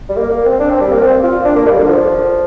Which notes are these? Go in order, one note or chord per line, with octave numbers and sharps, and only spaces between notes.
G3
A#3
A#3
C4
D4
C4
G3
A#3
C4
F4
D4
A#3
G3
D3
F3